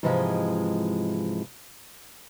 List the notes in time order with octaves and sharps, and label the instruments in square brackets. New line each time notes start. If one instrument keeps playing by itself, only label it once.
[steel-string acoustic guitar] G#2 C3 E3 F3 G3 G#3